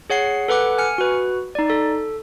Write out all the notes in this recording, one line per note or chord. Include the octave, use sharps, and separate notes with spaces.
G#4 C#5 F#5 C7
A4 B4 F#5 D6 F#6
G#5 F6 C#7
F#4 B4
D#4 D5
A4